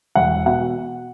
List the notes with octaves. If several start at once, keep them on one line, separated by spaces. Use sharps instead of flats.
E1 F#5
B2 F#5